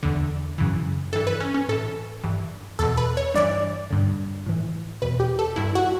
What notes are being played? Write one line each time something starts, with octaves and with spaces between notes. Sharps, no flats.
E2 D3
F#2 C#3 E3
G2 E3 A4
B4
C#4
C#4
A2 E3 A4
G2 E3
E2 B2 A4
B4
C#5
G2 E3 D5
G2 D3
A2 E3
E2 B2 B4
G4
A4
G2 E3 E4
F#4